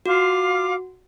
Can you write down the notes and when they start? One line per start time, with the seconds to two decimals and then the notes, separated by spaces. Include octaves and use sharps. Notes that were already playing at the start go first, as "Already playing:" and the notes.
0.06 F4 F#4 F5 D6